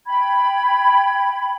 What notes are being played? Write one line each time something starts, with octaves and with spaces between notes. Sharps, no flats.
G5 B5 G#6